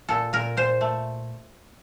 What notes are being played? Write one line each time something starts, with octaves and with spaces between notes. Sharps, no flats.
A#2 A4
A#2 A#4
A#2 C5
A3